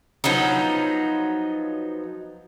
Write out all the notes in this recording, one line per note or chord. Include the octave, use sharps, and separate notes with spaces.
F3 F#3 B3 D#4